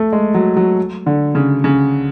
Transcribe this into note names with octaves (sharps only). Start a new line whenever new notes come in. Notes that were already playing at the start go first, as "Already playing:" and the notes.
Already playing: A3
G#3
F#3
F#3
D3
C#3
C#3